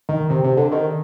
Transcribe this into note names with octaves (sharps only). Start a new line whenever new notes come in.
D#3
C3
C3
D3
D#3